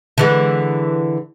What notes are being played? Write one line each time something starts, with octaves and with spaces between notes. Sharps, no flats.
D3 E3 G#3